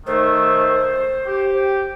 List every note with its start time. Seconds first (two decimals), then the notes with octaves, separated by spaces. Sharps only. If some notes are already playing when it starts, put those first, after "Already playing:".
0.06 D#3 A3 C5
1.27 G4